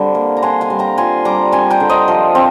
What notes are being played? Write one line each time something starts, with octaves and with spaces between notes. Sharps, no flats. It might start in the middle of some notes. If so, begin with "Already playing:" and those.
Already playing: D3 G3 C4
A#3
A#5
D4 G#5 C6
F5 G#5
G3
G5 A#5
F4 G#5 C6
G3 A#5 D6
C4 G#5 C6
G5 A#5
D3
C5 D#5
F3
C4